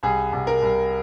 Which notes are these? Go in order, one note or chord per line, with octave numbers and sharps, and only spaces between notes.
C2 G#4
C2
A#4
C2